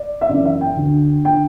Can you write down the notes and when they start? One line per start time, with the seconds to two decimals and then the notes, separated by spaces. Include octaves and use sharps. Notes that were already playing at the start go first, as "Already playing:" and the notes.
Already playing: D5
0.21 E5
0.29 F#2 C#3 E3 D5
0.45 E5
0.61 G5
0.77 D2 D3
1.25 D3 G5